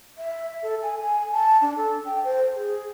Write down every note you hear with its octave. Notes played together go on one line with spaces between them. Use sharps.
E5
A4
G#5
G#5
A5
D4
A4
G5
C5
G#4